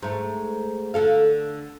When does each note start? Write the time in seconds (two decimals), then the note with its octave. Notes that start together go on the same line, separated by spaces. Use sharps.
0.02 G#2 A3
0.94 D3 A4 F5